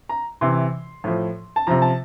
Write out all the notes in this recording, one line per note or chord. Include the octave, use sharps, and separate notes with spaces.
A#5
C3 E3 C6
A2 F3
A5
C3 F3 A#5
A5